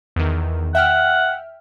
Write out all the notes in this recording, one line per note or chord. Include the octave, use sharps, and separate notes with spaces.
E2 D#3
E5 F#5 G5 F6